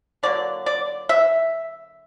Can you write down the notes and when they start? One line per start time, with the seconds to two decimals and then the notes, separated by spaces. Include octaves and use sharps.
0.23 D3 F#3 A#3 D5
0.66 D5
1.09 E5